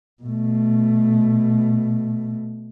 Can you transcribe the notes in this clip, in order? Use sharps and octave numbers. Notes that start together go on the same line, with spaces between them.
B2 A3